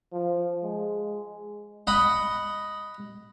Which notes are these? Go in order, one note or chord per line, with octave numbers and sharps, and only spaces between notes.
F3
G#3
D#5 F#5 B5